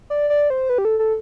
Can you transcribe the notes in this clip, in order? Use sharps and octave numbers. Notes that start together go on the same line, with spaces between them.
D5
D5
C5
B4
G4
A4
A4